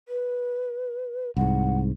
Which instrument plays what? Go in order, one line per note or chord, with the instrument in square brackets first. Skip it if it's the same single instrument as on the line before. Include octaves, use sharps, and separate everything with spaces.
[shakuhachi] B4
[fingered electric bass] C2 G#2 [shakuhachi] F#5